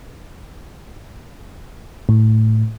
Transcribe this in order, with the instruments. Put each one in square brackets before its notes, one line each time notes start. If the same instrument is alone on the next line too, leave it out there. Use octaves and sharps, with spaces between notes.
[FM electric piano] A2